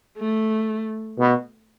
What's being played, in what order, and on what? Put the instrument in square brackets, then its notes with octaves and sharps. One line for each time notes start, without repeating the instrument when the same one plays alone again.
[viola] A3
[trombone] B2